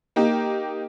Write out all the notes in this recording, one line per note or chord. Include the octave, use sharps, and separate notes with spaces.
A#3 D#4 G4